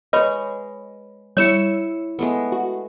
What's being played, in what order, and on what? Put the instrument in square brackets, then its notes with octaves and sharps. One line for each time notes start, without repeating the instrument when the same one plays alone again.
[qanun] G#3 C#6 [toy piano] B4 C#5 B5 [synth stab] D#5
[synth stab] G3 E6 C#7 [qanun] E4 C#6 [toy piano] C#5
[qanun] G#3 A3 B3
[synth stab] F#4